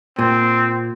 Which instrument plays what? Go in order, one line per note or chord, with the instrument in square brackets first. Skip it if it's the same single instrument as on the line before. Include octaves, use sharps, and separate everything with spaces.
[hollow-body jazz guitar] A#2 [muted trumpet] C4